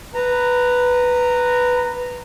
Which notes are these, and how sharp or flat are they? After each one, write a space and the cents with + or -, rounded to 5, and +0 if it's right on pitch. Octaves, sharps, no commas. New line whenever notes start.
B4 +0 A#5 -15